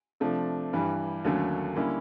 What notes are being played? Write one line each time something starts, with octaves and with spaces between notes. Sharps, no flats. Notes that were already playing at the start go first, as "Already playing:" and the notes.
C3 F3 A3 D4
G2 E3 G3
D#2 D3 F#3 A3 C#4
D3 G3 A#3 C#4 E4